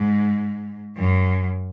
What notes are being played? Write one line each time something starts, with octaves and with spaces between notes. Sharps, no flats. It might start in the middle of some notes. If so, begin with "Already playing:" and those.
Already playing: G#2
F#2